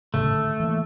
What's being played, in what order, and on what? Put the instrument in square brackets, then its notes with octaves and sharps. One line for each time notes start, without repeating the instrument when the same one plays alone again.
[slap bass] D1 G#1 C#3 [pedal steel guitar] A3
[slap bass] D3
E3 A#3